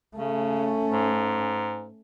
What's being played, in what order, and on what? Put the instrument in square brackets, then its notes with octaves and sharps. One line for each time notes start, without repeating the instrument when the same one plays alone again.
[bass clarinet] C#3 [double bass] A3 C#4
[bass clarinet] G#2